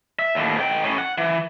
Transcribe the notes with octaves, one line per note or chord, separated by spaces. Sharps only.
E5
D#2 A2
G#2 G5
A2 C#4
F#5
E3